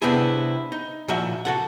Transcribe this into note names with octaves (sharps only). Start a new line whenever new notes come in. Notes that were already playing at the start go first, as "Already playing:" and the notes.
C3 B3 C4 D4 E4 G#4
D#4
A#2 F3 F#4 E5
F#4 A4 F#5